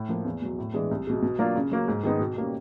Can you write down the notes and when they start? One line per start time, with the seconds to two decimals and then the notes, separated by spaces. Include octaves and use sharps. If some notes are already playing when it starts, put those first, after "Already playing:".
Already playing: A2
0.09 F3 A#3
0.25 E2
0.42 B2 F#3
0.58 A2
0.74 E3 G#3 B3 D4
0.91 C2
1.07 B2 G#3
1.22 B2
1.39 F#3 A#3 D4 F4
1.56 C#3
1.72 F#3 A#3 C#4
1.88 G#2
2.03 D#3 G#3 B3 D#4
2.19 B2
2.37 G3 A#3 C#4